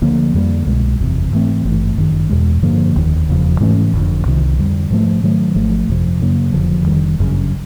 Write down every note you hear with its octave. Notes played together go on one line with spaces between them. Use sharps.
D2 D3 F3 A#3
F2 D3 G3 A#3
C2 B2 G#3
F#1 E2 C3
G#2 E3 A3 C4
G#1 G2 E3 A3
G1 F#2 D#3
E2 B2 G#3
G2 D3 F3 A#3
F1 D#2 D#3
E1 E2 C#3 F3
G#2 E3 A3 C#4
F#1 F2 D3
C2 C3 D#3
F2 D3 G3
G#2 F3 A3
G#2 D#3 F#3 A3
G#1 G#2 F3 A3
G1 F2 C3 F3
F#2 C#3 F#3 A#3
F1 F2 D3 F3
F1 D#2 D#3 G3
G1 F#2 C#3